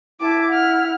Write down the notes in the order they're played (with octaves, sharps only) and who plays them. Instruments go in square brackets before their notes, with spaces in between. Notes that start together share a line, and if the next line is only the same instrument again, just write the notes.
[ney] E4 [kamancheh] A5 D6
[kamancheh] F#5 F6